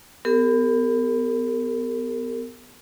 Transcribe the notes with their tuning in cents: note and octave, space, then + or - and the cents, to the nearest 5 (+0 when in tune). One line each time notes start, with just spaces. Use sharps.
B3 +20 G4 +30 A#4 -35